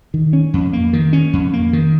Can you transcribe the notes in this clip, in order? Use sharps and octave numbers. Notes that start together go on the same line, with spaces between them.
D#3
C#4
F2
A#3
D#3
C#4
F2
A#3
D#3